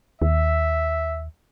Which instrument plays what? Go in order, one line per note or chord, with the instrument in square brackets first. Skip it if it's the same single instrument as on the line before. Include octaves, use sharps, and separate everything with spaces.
[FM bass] D#2 [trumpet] E5